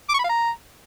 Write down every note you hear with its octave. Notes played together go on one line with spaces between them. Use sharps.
D6
C#6
B5
F5
A#5